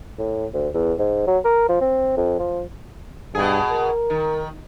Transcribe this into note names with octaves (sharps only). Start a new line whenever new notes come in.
A2
D2
E2
G#2
F#3
A#4
F3
C4
F2
F3
G2 B2 G#4
A#4
D#3